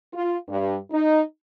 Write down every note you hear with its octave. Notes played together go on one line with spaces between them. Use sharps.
F4
G2
D#4